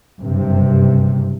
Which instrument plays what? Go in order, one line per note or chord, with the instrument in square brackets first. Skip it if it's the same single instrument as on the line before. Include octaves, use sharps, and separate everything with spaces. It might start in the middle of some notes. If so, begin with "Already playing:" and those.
[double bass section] F#1 G2 C3